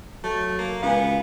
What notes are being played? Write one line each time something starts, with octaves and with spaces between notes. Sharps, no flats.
F#3 A3
A#3
C#2 B3 F5 G#5